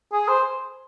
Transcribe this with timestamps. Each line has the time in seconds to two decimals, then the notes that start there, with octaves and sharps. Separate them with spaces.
0.12 G#4
0.28 C5